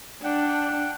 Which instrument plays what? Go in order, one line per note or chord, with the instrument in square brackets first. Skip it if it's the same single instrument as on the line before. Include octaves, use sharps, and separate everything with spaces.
[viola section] D4 [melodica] F#5 G5